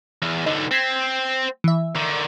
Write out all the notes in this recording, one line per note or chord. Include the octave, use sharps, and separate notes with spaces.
E2
B1 D3 D#4
C4 G#6 B6 C7
E3 E5
D3 D#3